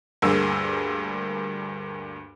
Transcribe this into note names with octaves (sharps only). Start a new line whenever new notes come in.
D2 G2 A#3 G#4 E6